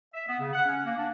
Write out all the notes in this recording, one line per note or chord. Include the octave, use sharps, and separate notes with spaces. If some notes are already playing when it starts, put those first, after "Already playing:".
E5
B3
C#3
F#5
C#4
A#3
D4